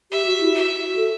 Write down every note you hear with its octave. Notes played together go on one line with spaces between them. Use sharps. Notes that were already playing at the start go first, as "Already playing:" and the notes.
G4 E5
F#4
E4
F#4 E5
A4